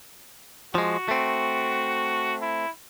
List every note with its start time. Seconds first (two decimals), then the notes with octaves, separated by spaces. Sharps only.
0.75 F3 G#3 F#4
1.08 A3 C4
2.42 E4